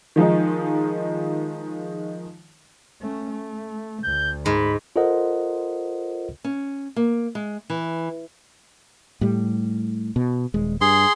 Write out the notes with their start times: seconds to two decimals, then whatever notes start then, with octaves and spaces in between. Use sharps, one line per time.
0.16 D#3 F3 G#3 D#4
3.02 A3 C#4
3.31 A3
4.04 D2 G6
4.46 G#2 B5
4.96 F4 A4 A#4 C5 D#5 F#5
6.44 C#4
6.96 A#3
7.35 G#3
7.70 E3
9.21 A2 G3
10.16 B2
10.54 D#1 G#3
10.81 G2 G#4 C6